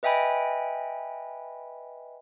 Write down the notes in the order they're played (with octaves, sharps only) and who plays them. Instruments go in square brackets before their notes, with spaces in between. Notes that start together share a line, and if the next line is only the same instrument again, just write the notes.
[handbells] B4 D#5 E5 G5 G#5 B5